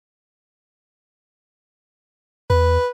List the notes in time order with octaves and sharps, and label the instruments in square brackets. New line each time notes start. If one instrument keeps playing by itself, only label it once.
[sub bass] E2 [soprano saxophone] B4